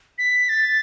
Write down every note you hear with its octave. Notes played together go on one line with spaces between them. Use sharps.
B6
A6